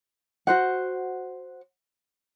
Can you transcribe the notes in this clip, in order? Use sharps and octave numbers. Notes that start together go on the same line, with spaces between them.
F#4 C5 F#5